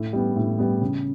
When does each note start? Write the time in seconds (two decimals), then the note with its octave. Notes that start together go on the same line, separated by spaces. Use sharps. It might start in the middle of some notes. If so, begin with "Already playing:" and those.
Already playing: A2
0.13 G3 B3
0.36 A2
0.58 G3 B3
0.81 C#3